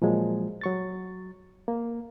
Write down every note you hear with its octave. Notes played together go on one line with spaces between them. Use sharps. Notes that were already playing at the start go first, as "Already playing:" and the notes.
A#2 F3 F#3 G#3
F#3 C#6 A6
A#3